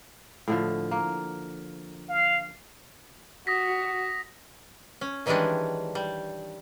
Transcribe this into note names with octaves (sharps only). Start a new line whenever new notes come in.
A2 D3 F3
A#3
F5
F#4 D#6 A#6 B6
C#4
D#3 E3 G3 G#3 C#4 D4
G3